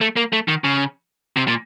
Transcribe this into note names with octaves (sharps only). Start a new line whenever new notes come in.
A3
A#3
A3
D#3
C#3
C3
A#2